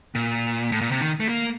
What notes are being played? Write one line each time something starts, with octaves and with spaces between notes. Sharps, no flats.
A#2
A2
A#2
C3
D#3
A3
A#3